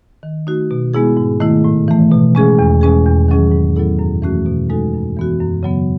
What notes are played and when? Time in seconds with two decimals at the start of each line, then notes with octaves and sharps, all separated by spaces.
0.23 D#3
0.47 A3 D#4 F#4
0.71 B2
0.94 G#3 B3 E4 G#4
1.17 G#2
1.40 D#3 A3 E4
1.64 A2
1.88 E3 A3
2.11 B2
2.35 G#3 C#4 G#4
2.59 E2
2.81 B2 G#3 C#4 G#4
3.06 E2
3.28 D#3 F#3 C#4 G#4
3.52 G#2
3.76 F#3 B3 E4 A4
3.99 F#2
4.22 E3 A3 C#4 F#4
4.46 B2
4.69 G#3 D#4 F#4 A4
4.93 F#2
5.17 E3 B3 F#4
5.40 F#2
5.63 C#3 F#3 B3